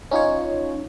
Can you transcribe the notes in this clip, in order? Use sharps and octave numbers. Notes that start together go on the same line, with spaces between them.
C#4 D#4 F4 C#5